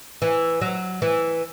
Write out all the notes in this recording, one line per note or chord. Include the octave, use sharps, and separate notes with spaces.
E3
F#3
E3